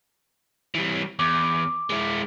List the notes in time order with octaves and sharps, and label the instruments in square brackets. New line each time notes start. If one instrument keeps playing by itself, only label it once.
[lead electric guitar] E3 G3
[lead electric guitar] E2 [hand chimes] D6
[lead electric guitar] G#3 E4